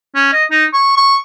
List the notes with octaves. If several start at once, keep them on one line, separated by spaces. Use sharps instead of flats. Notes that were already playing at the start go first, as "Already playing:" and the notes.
C#4
D#5
D#4
C#6
C#6